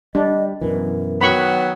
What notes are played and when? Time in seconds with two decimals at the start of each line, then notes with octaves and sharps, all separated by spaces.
0.15 G3 D4 D#5
0.61 F#2 B2 E3 A#4
1.21 D#3 F#3 B3 B5 C#6